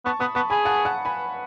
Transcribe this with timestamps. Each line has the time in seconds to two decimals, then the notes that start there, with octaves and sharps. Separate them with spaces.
0.05 B3 A5 C#6
0.20 B3 B5 D#6
0.35 B3 A5 C#6
0.50 G#4 G#5 B5
0.65 F#5 A5
0.85 F#5 A5
1.05 G#5 B5